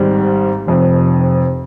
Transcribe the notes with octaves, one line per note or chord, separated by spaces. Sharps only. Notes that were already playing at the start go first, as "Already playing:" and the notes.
Already playing: G#1 G#2 G3
F1 F2 C3